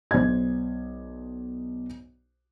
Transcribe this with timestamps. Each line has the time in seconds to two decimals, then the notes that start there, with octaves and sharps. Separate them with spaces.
0.11 B1 C5 D5 G#6